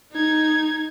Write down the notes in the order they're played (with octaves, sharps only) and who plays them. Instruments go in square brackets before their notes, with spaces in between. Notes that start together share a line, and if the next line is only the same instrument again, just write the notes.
[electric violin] D#4 G#6